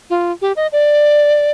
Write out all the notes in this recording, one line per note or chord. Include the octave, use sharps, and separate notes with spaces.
F4
G4
D#5
D5